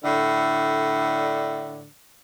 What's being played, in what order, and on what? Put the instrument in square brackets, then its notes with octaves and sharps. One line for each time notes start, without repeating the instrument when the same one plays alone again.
[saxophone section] A2 D3